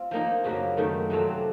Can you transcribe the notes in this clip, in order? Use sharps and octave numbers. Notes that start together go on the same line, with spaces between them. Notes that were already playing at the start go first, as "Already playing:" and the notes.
Already playing: C4 F4
F3 A#3 D#4
F#2 C#3 F#3 A#3
F#2 D#3 A3
F2 C3 F#3 C4